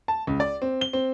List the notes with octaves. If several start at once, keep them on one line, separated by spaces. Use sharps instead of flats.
A5
C#2
D5
C4
G7
C4